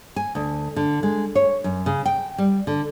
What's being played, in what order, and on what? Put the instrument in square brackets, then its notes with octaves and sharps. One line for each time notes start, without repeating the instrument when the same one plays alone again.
[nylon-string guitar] G#5
D2
D3
G#3
C#5
F#2
C#3
G5
G3
D3